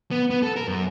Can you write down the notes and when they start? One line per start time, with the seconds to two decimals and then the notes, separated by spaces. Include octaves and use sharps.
0.11 B3
0.30 B3
0.43 A4
0.56 A#4
0.68 F#2